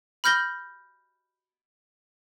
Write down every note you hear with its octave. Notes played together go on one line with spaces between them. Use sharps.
B5 F6 G6 A#6 G7